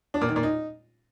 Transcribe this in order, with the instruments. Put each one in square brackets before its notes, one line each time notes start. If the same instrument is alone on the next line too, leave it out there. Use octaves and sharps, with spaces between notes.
[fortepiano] D4
A#2
D#3
A#2
D#4